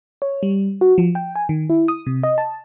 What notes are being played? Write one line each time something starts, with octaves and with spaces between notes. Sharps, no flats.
C#5
G3
F#4
F3
G5
G#5
D#3
E4
D#6
C3
D#5
A5